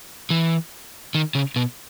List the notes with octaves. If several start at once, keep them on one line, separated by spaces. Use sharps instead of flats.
E3
D#3
C#3
B2